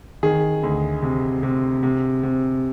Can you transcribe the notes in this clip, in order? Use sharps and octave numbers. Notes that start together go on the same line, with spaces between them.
D#3 G#4
D2
C3
C3
C3
C3